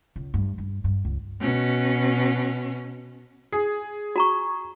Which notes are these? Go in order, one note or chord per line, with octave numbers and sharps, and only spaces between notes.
C#2
G2
G2
G2
C#2
B2 C#4
G#4
F#4 A#5 C#6